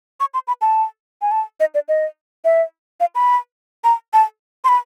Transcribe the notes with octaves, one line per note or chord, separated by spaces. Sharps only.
C#6
C6
B5
A5
G#5
A5
D#5
D5
D#5
E5
F5
B5
A#5
A5
C6
B5